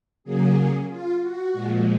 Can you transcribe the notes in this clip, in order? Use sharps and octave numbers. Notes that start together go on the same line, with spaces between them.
C#3 F#3 A#3 G#4
F4
F#4
A#2 F3 G#3